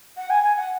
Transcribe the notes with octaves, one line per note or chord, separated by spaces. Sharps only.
F#5
G#5
G#5
F#5